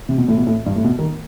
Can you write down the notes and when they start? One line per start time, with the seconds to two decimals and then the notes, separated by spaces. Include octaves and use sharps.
0.09 C3
0.18 B2
0.28 A2
0.37 B2
0.47 A2
0.66 G2
0.76 A2
0.84 B2
0.99 D#3